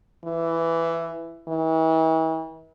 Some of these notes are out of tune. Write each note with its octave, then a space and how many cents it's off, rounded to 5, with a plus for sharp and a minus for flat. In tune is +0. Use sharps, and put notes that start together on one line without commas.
E3 +10
E3 -40